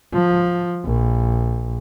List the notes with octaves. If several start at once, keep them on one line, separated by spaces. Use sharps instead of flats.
F3
A#1